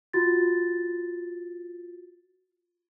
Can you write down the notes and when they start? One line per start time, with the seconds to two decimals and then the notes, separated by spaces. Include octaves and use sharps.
0.13 F4 F#4 A6